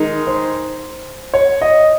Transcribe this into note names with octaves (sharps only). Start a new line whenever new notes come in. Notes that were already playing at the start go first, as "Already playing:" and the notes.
Already playing: D#3 G#3 D#4
C5
C#5
D#5